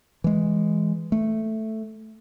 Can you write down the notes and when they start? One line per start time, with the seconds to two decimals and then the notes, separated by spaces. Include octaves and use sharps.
0.24 E3 G#3
1.12 A3